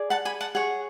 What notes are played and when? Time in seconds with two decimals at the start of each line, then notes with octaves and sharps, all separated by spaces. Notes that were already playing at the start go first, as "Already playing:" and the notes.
Already playing: G#4 D5
0.10 F#5 A5
0.25 G#5 B5
0.40 F#5 A5
0.55 G#4 C#5 F#5